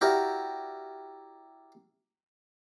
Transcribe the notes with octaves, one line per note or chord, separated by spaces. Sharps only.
E4 F#4 G4 A#4 D5